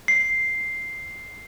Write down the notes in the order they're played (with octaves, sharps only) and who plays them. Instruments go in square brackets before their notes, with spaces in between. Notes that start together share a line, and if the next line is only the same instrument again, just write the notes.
[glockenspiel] C7